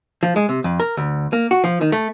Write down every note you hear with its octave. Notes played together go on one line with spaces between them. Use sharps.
F3
G#3
C3
F2
A#4
D2
A#3
F#4
F3
D#3
A3